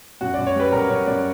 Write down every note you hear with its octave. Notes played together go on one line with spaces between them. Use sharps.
F#2 F#4
F#2 D5
C#5
G3 B4
F#2 A#4
F#2 C#5
F#2 D5